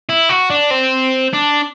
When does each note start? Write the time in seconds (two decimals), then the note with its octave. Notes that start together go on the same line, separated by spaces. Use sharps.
0.09 E4
0.29 F#4
0.50 D4
0.71 C4
1.34 D4